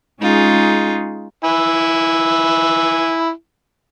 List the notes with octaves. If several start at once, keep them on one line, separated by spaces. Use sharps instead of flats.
G#3 C#4 D#4 F4 G#4
E4 G#5